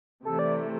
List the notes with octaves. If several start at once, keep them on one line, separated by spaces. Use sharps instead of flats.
C3 E3 A3 A4
D5